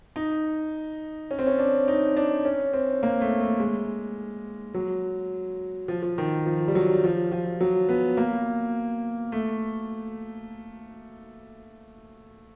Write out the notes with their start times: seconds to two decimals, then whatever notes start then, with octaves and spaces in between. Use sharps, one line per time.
0.16 D#4
1.31 C#4
1.39 C4
1.47 C#4
1.59 D4
1.88 D#4
2.16 D4
2.45 C#4
2.73 C4
3.03 A#3
3.21 A3
3.41 A3
3.60 G#3
4.74 F#3
5.88 F3
6.02 F3
6.18 D#3
6.46 F3
6.68 G3
6.75 F#3
7.04 F3
7.32 F3
7.61 F#3
7.89 B3
8.17 A#3
9.32 A3